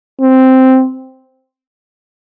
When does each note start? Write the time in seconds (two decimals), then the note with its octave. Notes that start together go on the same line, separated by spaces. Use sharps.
0.21 C4